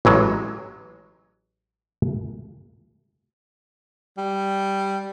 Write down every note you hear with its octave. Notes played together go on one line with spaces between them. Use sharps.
A1 E3 F#3 G#3
G3